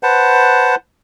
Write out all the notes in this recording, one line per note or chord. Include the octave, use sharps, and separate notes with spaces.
B4 C5 F#5 A5